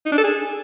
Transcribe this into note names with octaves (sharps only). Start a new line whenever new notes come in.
D#4
D4
A4
G#4